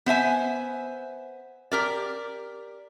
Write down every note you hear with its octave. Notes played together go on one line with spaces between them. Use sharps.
B3 C5 E5 G#5
G4 A#4 D5